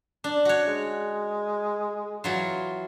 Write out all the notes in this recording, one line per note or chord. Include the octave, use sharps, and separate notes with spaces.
D4
F#4 C#5
G#3
E3 F#3 F4